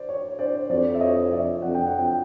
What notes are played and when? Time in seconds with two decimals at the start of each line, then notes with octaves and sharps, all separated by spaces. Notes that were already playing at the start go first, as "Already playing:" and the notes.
Already playing: C5 D5
0.09 C#5
0.39 C5 D5
0.70 F2 C5 D5
0.95 E5
1.01 C#5 D#5
1.32 D5 E5
1.62 F2 F#5
1.75 G5
1.87 F#5
1.99 G5